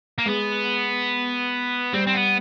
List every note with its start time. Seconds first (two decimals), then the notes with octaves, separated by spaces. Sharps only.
0.18 A#3
0.26 G#3 B3
1.93 G3 C4
2.07 C4
2.14 B3